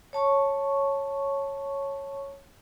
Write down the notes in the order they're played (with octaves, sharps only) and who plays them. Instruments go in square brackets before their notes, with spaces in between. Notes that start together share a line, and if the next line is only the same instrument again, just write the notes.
[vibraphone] C#5 A5 C#6